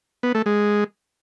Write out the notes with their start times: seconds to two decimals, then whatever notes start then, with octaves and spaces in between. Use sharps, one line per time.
0.23 B3
0.35 A3
0.46 G#3